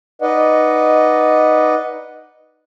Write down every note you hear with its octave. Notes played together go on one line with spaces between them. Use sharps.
D#4 B4 D5 D#5 F#5